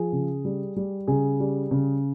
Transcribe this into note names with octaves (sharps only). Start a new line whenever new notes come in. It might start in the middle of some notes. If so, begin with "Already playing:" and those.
Already playing: F3 G#4
C#3
G3
G3
C#3 G#4
G3
C#3